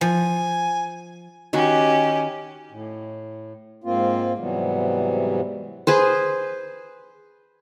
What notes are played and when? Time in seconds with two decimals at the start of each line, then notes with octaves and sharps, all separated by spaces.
0.01 F3 G#5
1.53 D#3 C#4 F#4 G4 C#6
2.71 A2
3.84 G#2 A#3 C4 F4
4.38 G#2 C3 E3 F#3 G3 B3
5.87 G#4 B4 C5